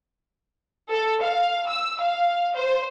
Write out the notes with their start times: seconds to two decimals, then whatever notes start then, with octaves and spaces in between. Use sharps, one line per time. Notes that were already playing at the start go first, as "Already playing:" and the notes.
0.91 A4
1.21 F5
1.69 E6
2.01 F5
2.55 C5